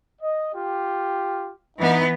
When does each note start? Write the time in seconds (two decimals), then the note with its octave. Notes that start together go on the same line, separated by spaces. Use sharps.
0.22 D#5
0.55 F4 G4
1.78 E3 B3 D#4